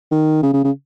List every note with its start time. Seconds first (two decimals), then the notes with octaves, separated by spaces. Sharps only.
0.12 D#3
0.43 C#3
0.53 C#3
0.64 C#3